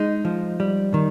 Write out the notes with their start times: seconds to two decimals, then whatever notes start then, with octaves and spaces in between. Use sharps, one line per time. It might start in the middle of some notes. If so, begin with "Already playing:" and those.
Already playing: G#3 D#4
0.25 F3
0.60 G3
0.94 D#3